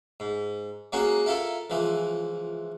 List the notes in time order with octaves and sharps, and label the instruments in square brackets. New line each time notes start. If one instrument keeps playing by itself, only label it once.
[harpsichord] G#2
F#3 G#3 A#3 C#4 F#4
E4 F4 A4 A#4
C#2 E3 F3